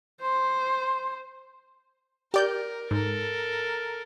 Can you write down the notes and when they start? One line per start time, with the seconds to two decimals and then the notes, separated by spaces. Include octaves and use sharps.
0.21 C5 C6
2.34 G4 A#4 D5 G6
2.91 G#2 A4 A#4